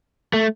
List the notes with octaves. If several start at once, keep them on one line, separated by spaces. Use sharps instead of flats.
A3